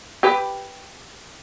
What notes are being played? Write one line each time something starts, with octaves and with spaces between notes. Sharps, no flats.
G4 B4